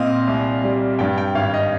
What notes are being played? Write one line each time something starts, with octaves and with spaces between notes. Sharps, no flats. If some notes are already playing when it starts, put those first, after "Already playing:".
Already playing: A#2 C4 D#5 F5
C2
G3
G2 G5
G5
G#1 F5
D#5